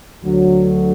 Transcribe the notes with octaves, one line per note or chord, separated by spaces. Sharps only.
D2 D3 F#3